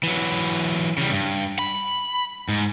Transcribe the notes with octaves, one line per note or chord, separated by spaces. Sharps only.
E3 F#3
C#3 G3
G2
B5
G#2